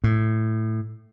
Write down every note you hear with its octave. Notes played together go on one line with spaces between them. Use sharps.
A2